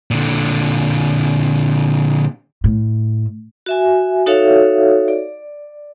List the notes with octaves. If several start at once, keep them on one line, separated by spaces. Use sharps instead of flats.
A#2 D3
A2
F#4 E5 G#5
D#4 F#4 A4 C#5 E5 F5
D5